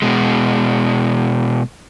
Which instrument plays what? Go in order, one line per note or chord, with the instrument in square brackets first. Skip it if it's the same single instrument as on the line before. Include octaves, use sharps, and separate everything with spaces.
[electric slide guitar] B2 G#3